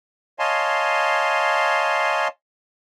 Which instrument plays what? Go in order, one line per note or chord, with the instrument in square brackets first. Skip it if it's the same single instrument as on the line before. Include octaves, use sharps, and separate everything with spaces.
[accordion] C#5 D#5 F5 G#5 A5 C6